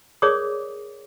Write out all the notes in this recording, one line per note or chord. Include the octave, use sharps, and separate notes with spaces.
G#4 A#4 C#5 D5 D6 D#6